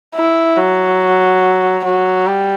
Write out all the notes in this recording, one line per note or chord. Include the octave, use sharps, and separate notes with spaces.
E4
F#3
F#3
G3